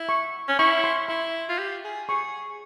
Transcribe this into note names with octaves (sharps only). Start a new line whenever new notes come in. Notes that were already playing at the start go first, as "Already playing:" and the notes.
Already playing: E4
C#6
C#4
E4 C#6
C6
E4 C6
F4
G4
G#4
G#4 C#6